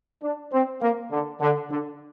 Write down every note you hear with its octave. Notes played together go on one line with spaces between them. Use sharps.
D4
C4
A#3
D3
D3
D3